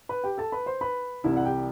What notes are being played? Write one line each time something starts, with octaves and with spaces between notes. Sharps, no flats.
B4 B5
G4 G5
A4 A5
B4 B5
C5 C6
B4 B5
C2 C3 E3 G3 E4 E5
F#5
G4 G5